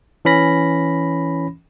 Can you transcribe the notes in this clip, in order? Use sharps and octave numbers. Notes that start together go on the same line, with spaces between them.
E3 C#4 B5 A#6